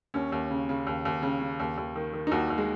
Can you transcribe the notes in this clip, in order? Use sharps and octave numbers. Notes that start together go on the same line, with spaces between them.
D#2 C#4
D#2
C#3
C#3
D#2
D#2
C#3
C#3
D#2
D#2
D#3
D#3
D#4
D#2 F#4
D#2
G#3